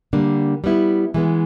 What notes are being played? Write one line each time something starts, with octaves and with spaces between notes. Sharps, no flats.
D3 G3 A#3 D4
G3 B3 E4
E3 G#3 B3